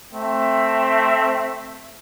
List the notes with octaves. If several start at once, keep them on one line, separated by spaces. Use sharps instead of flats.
A3 C4 E5